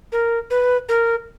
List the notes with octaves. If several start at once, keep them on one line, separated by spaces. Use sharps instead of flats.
A#4
B4
A#4